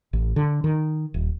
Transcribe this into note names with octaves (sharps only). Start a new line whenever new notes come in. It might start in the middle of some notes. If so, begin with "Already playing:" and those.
A1
D3
D#3
D#1